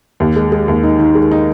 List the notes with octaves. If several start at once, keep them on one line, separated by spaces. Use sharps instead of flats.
D#2
G#3
G#3
D#2
D#4
D#3
G#3
D#4